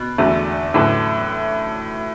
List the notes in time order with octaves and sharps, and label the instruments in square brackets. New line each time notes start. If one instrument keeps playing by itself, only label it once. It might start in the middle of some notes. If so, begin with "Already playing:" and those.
Already playing: [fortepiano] B2
[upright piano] E2 D3 A3 F#4
[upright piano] A2 F#3 A3 F#4 B4 [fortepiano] D3